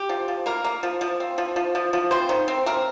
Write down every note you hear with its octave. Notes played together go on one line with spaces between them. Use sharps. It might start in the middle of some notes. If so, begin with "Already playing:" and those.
Already playing: G4
F3
F3
A#3 A#4
A#3
F3
F3
C4
F3
F3
F3
F3
C4 C5
D#3
C4
C4 A#4